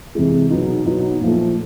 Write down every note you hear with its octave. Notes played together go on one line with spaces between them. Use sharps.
C3 E3 G#3
B2 F#3 B3 D#4
B2 F#3 B3 D#4
A#2 F3 A3